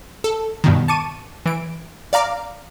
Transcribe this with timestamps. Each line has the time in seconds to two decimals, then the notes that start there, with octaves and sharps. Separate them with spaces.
0.24 A4
0.64 G2 B2 D#3
0.88 A5 C#6 D6 D#7
1.46 E3 D7
2.13 D5 F5 A#5 D6